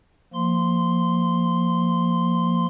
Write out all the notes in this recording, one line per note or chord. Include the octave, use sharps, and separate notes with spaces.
F3 A#3 C6